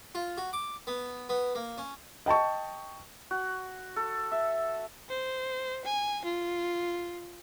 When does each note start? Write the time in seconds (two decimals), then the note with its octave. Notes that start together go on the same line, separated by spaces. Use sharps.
0.15 F4
0.38 F#4
0.53 D6
0.87 B3
1.29 B3
1.55 A#3
1.78 C#4
2.26 D#5 G5 A5 C#6
3.31 F#4
3.96 A4
4.31 E5
5.09 C5
5.85 G#5
6.25 F4